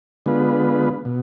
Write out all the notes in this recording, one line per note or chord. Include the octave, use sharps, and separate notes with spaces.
D3 G#3 B3 F4 B4
B2